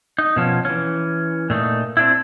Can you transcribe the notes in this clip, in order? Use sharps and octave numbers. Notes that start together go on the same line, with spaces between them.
D#4
B2 F3 C#4
E3 C#4
A#2 A3 D#4
C4 D4 E4